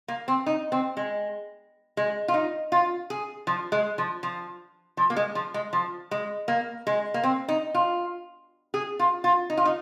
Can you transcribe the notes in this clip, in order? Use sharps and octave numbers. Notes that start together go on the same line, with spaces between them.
A#3
C4
D#4
C4
G#3
G#3
F4
D#4
F4
G#4
F3
G#3
F3
F3
F3
A#3
G#3
F3
G#3
F3
G#3
A#3
G#3
A#3
C4
D#4
F4
G#4
F4
F4
D#4
F4
D#4